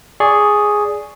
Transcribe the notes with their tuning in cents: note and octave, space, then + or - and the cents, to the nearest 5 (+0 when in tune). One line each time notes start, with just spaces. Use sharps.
G#4 +0 D5 -10 C#6 +0